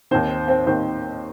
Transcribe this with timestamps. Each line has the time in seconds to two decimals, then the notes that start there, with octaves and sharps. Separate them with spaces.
0.11 D#2 D#3 C4 C5
0.48 C4 C5
0.67 D#2 D#3 C4 C5